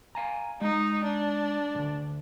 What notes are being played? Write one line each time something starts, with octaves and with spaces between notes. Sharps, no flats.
F5 G#5 A#5
G#3 D#4
D4
D2 G2